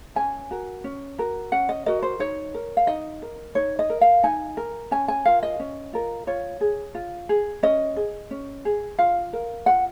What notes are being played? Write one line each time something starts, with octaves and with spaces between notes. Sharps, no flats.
C#4 G#5
F#4 A#4
C#4
F#4 A#4
C#4 F#5
D#5
F#4 A#4 D#5
C5
D#4 C#5
A#4
F5
D#4 D#5
A#4
D#4 C#5
D#5
A#4
F5
D#4 G#5
A#4
C#4 G#5
G#5
F4 A#4 F5
D#5
C#4
F4 A#4
F4 C#5
G#4
F4
G#4
C#4 D#5
G#4
C#4
G#4
F4 F5
A#4
F4 F#5